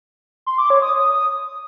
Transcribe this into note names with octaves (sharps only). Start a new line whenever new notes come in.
C6
D6
C#5
D#6